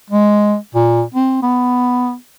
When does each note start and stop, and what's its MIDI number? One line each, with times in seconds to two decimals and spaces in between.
0.10 0.55 56
0.75 1.02 46
1.14 1.40 60
1.42 2.14 59